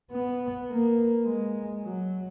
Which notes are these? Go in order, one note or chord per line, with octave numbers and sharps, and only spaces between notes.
B3
A#3
G#3
F#3